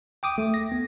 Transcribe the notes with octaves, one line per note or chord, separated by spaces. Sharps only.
G5 D6 D#6
A3
A#6
B3